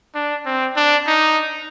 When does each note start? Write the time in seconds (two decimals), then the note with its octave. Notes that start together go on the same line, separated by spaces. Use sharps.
0.15 D4
0.46 C4
0.76 D4
1.07 D#4